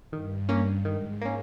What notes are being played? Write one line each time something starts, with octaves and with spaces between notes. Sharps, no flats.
G2 D#3
A#3 C#4
G#2 D#3
A#3 C#4